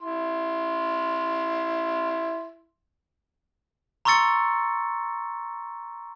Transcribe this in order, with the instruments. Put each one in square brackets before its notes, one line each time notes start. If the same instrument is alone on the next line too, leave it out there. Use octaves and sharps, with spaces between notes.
[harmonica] E4 C6
[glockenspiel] A#5 C6 C#6 E6 A6 C#7